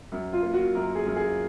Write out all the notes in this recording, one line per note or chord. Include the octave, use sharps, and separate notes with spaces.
F#2
F4
A#3
F#4
F#2 A#4
G#4
F#2
G#4